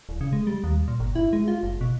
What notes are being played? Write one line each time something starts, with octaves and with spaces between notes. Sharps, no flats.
D1
C#3
G#3
G3
D#2
A#2
G1
E4
G#3
F4
F#1
B2